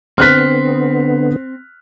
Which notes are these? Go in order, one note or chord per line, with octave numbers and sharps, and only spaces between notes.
D3 B3 C4 F6 F#6 B6